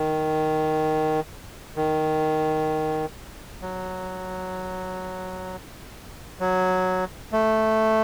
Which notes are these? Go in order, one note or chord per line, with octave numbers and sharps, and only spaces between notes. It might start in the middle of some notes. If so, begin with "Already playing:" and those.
Already playing: D#3
D#3
F#3
F#3
A3